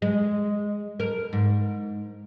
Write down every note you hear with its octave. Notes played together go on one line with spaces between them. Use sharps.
G#3
A#4
G#2